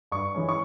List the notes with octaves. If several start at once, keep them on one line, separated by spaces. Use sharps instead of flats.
G2 C#6
E3 G#3 C#4
C#6